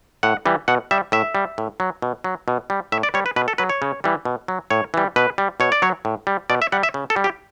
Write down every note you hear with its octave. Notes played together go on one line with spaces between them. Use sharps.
A2 F#5
E3 G3
B2 F#5
G3 E5
A2 E5
G3
A2
F#3
B2
F#3
B2
G3
A2 E5
D5
G3 C#5
B4
B2 B4
A4
F#3 B4
C#5
C#3
E3 G3
B2
F#3
A2 C#5
E3 G3
B2 B4
G3
B2 C#5
D5
F#3 C#5
A2
G3
B2 D5
E5
G3 F#5
E5
C#3
A4
G3
G4